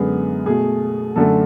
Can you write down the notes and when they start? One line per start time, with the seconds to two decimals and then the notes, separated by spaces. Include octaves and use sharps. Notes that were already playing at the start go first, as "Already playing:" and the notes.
Already playing: F#2 D3 G#3 B3 G#4
0.46 B2 A3 G#4
1.16 F#2 D3 A3 A4